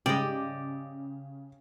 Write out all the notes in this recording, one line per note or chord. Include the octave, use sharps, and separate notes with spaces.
G#2 C#3 G3 G#3 G4 D5 D#5